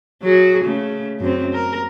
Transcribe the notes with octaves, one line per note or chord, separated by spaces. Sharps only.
F#3 F#4 G#4
C#3 A3
F#2 C4
A#4